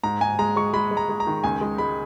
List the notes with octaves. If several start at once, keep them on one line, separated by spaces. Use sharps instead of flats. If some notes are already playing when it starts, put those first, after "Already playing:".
G#2 A#5
G#2 G#5
G#3 A#5
G#3 C#6
G#3 B5
G#3
A#5
G#3
A#5
D#3
C#2 G#5
G#3
G#3 B5